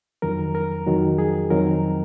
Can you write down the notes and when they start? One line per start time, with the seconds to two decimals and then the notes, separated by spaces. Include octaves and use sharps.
0.22 F2 D#3 F#3 A#4
0.55 A#4
0.86 F2 D#3 F#3 F#4
1.18 G#4
1.50 F2 D#3 F#3 C4 A#4